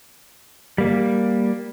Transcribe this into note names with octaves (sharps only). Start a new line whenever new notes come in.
G3 A#3